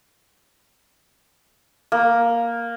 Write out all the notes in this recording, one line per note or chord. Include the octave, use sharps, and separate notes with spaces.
A#3